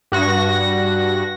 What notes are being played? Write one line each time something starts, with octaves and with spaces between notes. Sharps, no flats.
G2 F#4 A#6